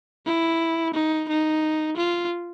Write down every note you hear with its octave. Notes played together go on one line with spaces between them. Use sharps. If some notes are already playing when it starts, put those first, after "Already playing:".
E4
D#4
D#4
F4